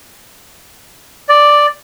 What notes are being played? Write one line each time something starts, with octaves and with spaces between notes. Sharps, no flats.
D5